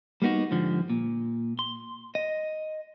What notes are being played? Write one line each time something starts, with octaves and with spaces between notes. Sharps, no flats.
G3 A#3 B3 D#4 F#4
G#2 D3 F3 G3
A#2
C6
D#5